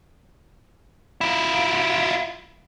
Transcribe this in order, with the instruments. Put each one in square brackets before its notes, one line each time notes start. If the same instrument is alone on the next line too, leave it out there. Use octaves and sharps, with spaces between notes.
[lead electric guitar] E4 F4